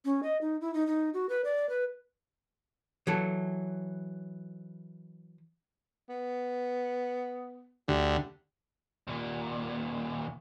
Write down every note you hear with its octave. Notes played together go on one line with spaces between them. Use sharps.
C#4
D#5
D#4
E4
D#4
D#4
F#4
B4
D5
B4
E3 F#3 A4
B3
D2 G4
D#2 A#2